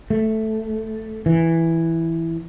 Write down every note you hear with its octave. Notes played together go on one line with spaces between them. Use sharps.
A3
E3